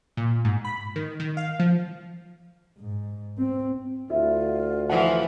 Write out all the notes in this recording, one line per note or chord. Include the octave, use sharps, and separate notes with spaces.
A#2
G#2
B5
D#3
D#3
F5
F3
G#2
C4
D2 E4 F4
E3 F3 F#5